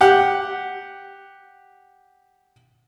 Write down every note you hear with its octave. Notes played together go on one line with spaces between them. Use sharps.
G4 F#5